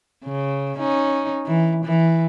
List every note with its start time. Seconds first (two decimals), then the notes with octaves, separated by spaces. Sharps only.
0.24 C#3
0.78 C#4 D#4
1.46 E3
1.85 E3